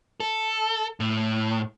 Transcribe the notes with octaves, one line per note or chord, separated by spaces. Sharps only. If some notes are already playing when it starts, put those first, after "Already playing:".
A4
A2